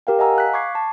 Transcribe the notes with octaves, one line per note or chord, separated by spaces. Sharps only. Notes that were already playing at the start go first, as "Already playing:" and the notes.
G4 A#4 F5 G5
D#5 F#5 G#5 A#5 E6
F5 F#6 B6
C#6 D6 G#6 C7
A5